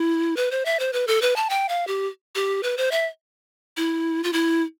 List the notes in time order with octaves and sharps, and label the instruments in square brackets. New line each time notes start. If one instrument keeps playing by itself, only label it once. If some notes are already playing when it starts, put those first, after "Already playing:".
Already playing: [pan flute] E4
B4
C5
E5
C5
B4
A4
B4
A5
G5
F5
G4
G4
B4
C5
E5
E4
F4
E4